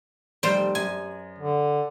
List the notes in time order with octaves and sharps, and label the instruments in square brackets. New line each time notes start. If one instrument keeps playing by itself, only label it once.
[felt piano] F1 D5 [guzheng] G3 C5 G5
[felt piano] F#2 [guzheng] G#5
[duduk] D3